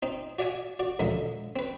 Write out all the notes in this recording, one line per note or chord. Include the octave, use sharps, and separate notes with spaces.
C4 D#4
F#4 D5 E5 F#5 G#5
F#4 D5
A#1 D#2 D3 G#3 E5
C4 B4